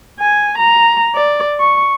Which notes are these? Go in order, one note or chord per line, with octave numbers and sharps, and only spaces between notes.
G#5
A#5
D5
C#6